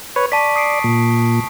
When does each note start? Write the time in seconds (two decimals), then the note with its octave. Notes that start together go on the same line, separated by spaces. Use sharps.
0.16 B4 C#5
0.32 D5 A5 C#6 B6
0.56 D#6 C7 D7
0.84 A#2